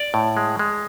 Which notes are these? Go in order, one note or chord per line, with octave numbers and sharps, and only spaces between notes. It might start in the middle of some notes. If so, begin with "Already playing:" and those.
Already playing: D5
A2
G#3
G#3